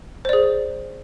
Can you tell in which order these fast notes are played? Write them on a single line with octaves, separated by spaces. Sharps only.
C5 D5 G#4